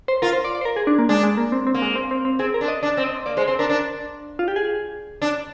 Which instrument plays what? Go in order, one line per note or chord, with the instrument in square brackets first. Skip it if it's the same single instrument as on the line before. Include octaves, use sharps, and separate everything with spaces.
[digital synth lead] C5
[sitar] F4 [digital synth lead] A#4
[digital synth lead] C5
D5
D5
C5
A#4
G#4
D4
A#3
[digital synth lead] G#3 [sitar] D4
[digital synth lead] G#3
A#3
C4
C4
[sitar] A#3
[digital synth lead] G#3
C4
C4
C4
[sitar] C4 [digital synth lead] G#4
[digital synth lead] A#4
[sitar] D4
[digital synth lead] D#5
[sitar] D4 [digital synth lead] D5
[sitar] C4
[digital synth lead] D#5
[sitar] A#3 [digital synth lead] D5
[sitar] G#3 [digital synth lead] C5
[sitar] C4 [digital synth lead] C5
[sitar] D4 [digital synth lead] A#4
[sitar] D4
[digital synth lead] F4
G4
G#4
[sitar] D4